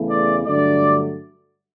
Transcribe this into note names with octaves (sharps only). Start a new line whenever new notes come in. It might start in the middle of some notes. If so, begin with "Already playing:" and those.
Already playing: E2 C#3 E3 A3
D5
G2 D3 F#3 A3 D5